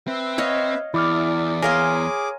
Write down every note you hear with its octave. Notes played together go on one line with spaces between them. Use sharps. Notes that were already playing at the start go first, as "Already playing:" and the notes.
C4 B4 E5
C#5 D#5 F5
E2 E4 D5 D6 F6
G#4 A#4 C#5 F5 G#5 C6 D6